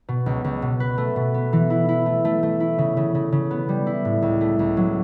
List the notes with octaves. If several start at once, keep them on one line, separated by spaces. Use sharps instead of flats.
B2
C#2
C#2
B2
B4
A3
B2
B3
E3
E4
E4
A3
A3
A3
E4
C#3
C#3
C#3
C#3
B3
G3
E4
A2
C#2
A3
C#2
F#3